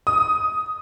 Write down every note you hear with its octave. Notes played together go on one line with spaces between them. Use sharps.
D#6